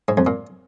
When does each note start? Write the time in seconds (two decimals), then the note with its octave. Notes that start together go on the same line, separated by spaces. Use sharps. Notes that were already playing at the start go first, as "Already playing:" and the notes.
0.08 G#2
0.17 F2
0.27 A#2